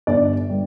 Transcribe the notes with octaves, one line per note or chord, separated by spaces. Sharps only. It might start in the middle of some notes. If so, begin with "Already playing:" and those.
G1 D5
G3